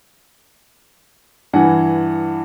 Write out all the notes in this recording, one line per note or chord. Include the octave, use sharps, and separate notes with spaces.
G2 E3 F#5 G#5